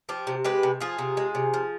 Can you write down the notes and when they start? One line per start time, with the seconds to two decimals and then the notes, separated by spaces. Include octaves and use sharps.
0.09 F3 G4
0.27 C3
0.44 G#3 G4 B4
0.63 C3
0.80 F3 F4 G#4
0.99 C3
1.17 G#3
1.35 C3
1.54 F3